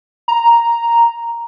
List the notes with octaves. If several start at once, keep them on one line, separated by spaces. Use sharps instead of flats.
A#5